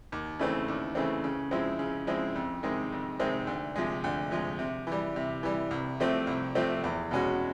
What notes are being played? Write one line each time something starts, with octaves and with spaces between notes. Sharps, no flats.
D#2
C#3 E3 A3 C4
D#2
C#3 E3 A3 C4
C#3
F3 G#3 C4 E4
C#3
F3 G#3 C4 E4
F2
C3 D#3 G#3 C4
F2
C3 D#3 G#3 C4
D2
C3 F3 G#3
D2
C3 F3 G#3
C3
E3 G3
C3
E3 G3
C2
C3 F3 A3 C4
C2
C3 F3 A3 C4
E2
B2 G#3 C#4 F#4